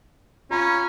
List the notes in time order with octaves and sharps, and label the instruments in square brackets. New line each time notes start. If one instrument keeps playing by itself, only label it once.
[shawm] C#4 [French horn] F4 [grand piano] A#5 B5